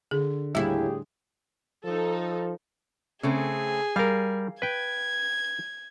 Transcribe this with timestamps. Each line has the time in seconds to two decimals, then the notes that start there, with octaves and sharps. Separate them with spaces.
0.11 D3 G#4
0.55 D#2 A2 G3 E4 G4 G#4
1.85 F3 D#4 A4
3.23 C#3 A3 C4 G#4
3.96 G3 A#4 F5
4.62 B4 G5 G#6